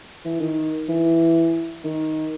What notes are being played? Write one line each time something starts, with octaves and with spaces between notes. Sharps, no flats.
E3
D#3
E3
D#3